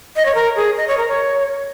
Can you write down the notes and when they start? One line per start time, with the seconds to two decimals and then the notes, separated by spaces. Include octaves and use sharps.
0.16 D#5
0.26 C#5
0.35 A#4
0.56 G#4
0.77 D#5
0.88 C#5
0.98 A#4
1.08 C#5